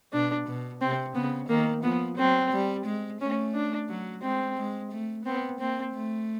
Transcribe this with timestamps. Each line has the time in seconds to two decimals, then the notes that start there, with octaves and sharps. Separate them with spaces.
0.13 B2 D4
0.48 B2
0.81 C3 C4
1.15 C#3 B3
1.49 D#3 A#3
1.83 F3 B3
2.18 F#3 C4
2.52 G3
2.86 G#3
3.21 A3 C#4
3.55 D4
3.90 F#3
4.23 G#3 C4
4.57 G#3
4.92 A3
5.26 B3 C4
5.60 A#3 C4
5.95 A3